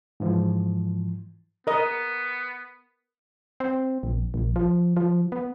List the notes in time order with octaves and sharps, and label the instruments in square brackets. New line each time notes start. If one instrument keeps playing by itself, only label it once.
[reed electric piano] G#2 E3 F3
[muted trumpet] B3 [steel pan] A#4 D#5
[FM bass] C4
A#1
A#1
F3
F3
B3